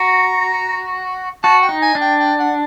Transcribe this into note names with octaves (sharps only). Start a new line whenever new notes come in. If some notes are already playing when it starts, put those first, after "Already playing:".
Already playing: F#4 A#5
F#4 A5
G5
D#4
G#5
D4
G5
G5
F#5